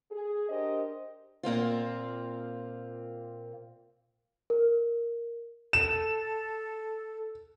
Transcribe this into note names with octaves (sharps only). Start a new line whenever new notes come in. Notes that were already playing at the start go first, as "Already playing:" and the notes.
G#4
D4 G4 A#4 C5 D#5
A#2 A#3 C4 F4
A#4
A4 E7